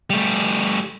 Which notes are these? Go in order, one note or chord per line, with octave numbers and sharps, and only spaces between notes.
G3 A3